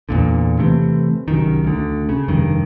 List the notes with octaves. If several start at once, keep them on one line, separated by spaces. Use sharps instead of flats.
E2 A#2 D3
C3 E3 A3 C4
C2 F#2 D#3
D2 D3
C#3
F1 G2 D#3